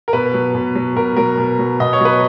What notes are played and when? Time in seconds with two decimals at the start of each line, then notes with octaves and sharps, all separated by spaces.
0.08 A#4
0.13 B2 B4
0.34 F#3
0.55 B2
0.75 F#3
0.96 B2 A#4
1.17 F#3 A#4
1.38 B2
1.59 F#3
1.80 B2 D#5
1.93 C#5
2.01 F#3 B4